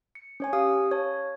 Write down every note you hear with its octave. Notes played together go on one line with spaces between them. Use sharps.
C#7
C#4 C#5 G#5
G4 F5 D#6
C#5 A5